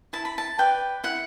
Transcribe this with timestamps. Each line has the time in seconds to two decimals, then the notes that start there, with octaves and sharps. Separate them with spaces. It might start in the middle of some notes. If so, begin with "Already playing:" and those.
0.13 E4 A5
0.25 B5
0.38 A5
0.58 B4 D5 G5
1.04 E4 F#5